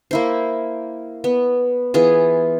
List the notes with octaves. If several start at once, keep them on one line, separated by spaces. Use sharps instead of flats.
A#3 E4 C5
B3
E3 B3 F4 G#4